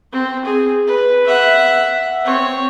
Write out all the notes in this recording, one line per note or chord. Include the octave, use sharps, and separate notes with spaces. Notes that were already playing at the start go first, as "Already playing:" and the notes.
C4
G#4
B4
E5 F#5
C4 C#5